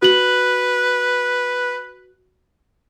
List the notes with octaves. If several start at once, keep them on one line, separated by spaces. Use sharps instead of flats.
F#4 B4 F#7